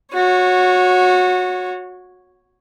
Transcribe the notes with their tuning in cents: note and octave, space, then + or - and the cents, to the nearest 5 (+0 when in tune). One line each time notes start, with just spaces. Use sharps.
F#4 -20 C#5 -5